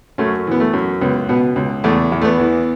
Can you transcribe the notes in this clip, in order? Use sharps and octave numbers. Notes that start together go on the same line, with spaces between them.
F#2 A3 C#4
E3 B3
A3
F#2
C#2 B3
B2 B3
C#2
E2 A3
E2
A3
B3
E3